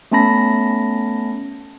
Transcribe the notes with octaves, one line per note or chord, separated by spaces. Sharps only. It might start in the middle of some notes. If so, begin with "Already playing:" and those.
A3 B3 C#4 A5 B5 A#6